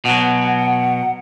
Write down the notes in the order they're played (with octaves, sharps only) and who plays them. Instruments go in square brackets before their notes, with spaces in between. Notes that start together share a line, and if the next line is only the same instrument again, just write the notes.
[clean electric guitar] B2 F#3 [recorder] F#5